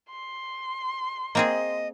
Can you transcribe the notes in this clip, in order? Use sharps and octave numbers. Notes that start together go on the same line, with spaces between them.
C6
A#3 C4 G#4 D#5